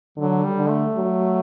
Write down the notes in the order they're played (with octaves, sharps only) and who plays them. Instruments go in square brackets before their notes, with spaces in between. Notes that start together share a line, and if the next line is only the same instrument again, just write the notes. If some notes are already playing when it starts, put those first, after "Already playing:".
[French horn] D3 [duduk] F#3
[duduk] G3
[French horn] D3
[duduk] A3
[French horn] F#3